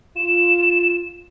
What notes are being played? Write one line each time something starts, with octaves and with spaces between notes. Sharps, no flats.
F4 E7